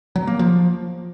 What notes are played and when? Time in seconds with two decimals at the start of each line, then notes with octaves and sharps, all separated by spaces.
0.16 F#3
0.27 A#3
0.39 F3